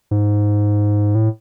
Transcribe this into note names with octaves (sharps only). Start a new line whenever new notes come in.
G#2
A2